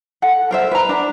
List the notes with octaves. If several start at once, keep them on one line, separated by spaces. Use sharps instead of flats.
A4 F#5
A#4 C5 E5
B4 A#5
D4